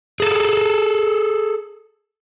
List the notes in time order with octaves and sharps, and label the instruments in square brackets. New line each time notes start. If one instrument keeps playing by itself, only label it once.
[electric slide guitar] G#4 A4